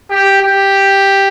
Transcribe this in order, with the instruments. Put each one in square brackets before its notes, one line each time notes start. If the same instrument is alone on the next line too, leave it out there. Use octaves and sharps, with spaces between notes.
[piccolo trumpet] G4
G4